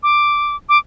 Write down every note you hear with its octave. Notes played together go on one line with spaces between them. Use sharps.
D6
D6